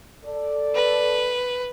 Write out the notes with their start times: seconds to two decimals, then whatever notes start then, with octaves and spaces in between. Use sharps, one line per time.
0.24 A4 D5
0.75 B4